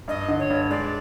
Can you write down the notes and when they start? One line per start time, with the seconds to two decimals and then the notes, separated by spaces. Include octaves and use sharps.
0.08 G2 D#5
0.28 D3
0.39 C#5
0.50 G2
0.70 G#3 D5